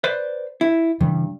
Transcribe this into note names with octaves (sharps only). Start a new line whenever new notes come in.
B4 C5 D5
E4
G2 C#3 E3 G3